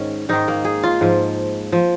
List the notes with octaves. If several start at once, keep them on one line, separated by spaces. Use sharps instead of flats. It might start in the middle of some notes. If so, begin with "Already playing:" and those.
Already playing: G#2 D#3 C#4
G#2 D#3 D#4
A#3
G#4
F4
G#2 F3
F3